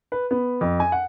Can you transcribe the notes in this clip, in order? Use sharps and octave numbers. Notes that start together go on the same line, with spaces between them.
B4
B3
F2
G#5
F#5